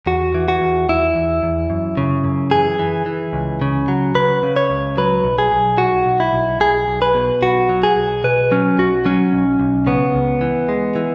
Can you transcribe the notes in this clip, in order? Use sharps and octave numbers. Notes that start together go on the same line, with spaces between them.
E2 F#4
E3
F#4
E2
E2 E4
E2
E2
F#2
C#3
F#2
E3 G#4
E3
E3
C#2
C#3
F#3
C#3 B4
C#3
C#5
C#2
F#3 B4
B1
G#4
B1
B1 F#4
B1
E4
B1
B1 G#4
B1
B4
B2
B1 F#4
F#3
G#4
B1
B2 B4
F#3 C#4
B1 F#4
F#3 C#4
B1
B1
C#3 B3
C#2
E3
G#3
E3